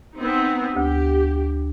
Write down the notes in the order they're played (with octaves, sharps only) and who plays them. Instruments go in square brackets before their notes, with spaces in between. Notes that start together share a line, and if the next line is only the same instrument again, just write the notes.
[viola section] B3 C4 D#4
[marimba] D2 [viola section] G4